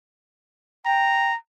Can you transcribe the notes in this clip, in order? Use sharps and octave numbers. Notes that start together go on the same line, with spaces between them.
G5 A#5